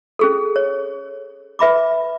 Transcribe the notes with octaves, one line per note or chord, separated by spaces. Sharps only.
C#4 G#4 A4
C#5
B4 E5 B5 D6